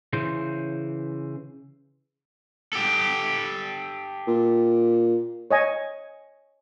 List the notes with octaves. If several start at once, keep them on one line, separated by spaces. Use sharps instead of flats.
C#3 E3 C5
G4 A4
A#2
C#5 D#5 G#5